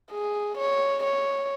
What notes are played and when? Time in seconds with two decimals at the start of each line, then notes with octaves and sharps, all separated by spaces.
0.12 G#4
0.58 C#5
1.03 C#5